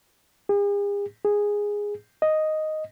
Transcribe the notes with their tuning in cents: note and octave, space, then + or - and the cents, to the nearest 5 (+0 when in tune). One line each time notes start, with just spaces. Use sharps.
G#4 -45
G#4 -10
D#5 +0